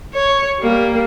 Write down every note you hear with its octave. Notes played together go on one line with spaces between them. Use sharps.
C#5
G3 A#3